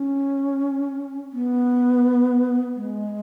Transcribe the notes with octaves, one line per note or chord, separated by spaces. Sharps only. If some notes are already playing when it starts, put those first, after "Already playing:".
Already playing: C#4
B3
G#3